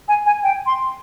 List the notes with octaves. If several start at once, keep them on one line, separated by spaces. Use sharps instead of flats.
G#5
G#5
G5
C6